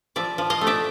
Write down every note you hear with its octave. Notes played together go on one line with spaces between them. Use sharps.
F3 D5 E5
F3
D#5 F5
A3
D5 E5